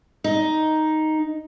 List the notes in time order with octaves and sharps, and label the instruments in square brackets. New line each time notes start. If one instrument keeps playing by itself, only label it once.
[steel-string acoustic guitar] D#4